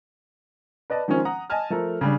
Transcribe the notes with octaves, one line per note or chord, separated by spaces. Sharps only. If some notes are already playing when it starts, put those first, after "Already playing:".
B4 D5 D#5 A5
D#3 F3 G#3 A#3 C4 C#4
F#5 A#5 D#6
D#5 G#5 A5 F6
F3 A3 A4 A#4
C#3 G3 D4